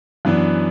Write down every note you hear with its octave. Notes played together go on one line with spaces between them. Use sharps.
F#2 E3 B3 D4